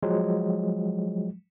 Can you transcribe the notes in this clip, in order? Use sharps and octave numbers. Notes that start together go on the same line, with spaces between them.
F3 F#3 G#3